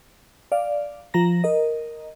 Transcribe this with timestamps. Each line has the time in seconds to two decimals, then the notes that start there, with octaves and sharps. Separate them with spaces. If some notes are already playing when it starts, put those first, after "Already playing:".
0.52 D5 F5
1.14 F3 A#5 A#6
1.44 A#4 D#5